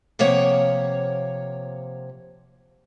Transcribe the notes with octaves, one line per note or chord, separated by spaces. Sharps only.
C3 F3 A#3 C#5 F#5